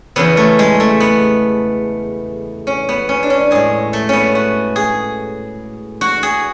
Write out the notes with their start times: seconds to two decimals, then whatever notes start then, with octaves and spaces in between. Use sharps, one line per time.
0.16 E2 C#3 E3 B3
0.37 A3
0.59 G#3
0.80 A3
1.00 B3
2.67 C#4
2.89 B3
3.09 C#4
3.23 D4
3.30 C#4
3.51 A2 G#3 G#4
3.93 A3
4.09 B3 C#4
4.35 F#4
4.76 G#4
6.01 F#4
6.23 G#4